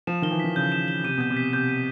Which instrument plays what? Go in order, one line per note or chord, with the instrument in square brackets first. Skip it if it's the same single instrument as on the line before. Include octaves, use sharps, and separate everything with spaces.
[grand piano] F3 [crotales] E7
[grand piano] D#3 [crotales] G7
[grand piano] E3
[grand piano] D#3 [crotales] B6
[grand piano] C#3 [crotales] G6
[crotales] E7
G7
[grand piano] C3 [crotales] D#7
[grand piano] B2 [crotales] G6
[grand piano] C3
[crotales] B6
[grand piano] C3 [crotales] G6
[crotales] D#7